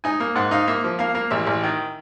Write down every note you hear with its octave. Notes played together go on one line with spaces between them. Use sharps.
D#4 G#5
A#3
G#2 F#5
D#4 F5
A#3 E5
F3
A#3 F5
A#3
A1 E5
A1
D#3